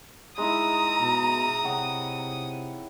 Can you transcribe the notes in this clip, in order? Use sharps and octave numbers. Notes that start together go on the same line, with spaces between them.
G#3 D#4 E4 A#5 D#6
B2
C3 C#5 F#5 G5